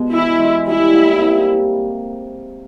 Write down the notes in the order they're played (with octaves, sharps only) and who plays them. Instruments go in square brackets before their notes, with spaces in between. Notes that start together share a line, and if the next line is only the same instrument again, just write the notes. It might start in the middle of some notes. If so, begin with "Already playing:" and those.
Already playing: [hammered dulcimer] B2 G#3
[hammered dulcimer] E3 [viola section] E4
[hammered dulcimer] G#3
[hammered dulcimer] G3 [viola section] E4
[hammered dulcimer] A#3
C3